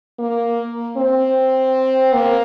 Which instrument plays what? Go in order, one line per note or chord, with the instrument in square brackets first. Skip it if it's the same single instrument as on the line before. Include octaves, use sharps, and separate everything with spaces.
[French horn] A#3
C4
A#3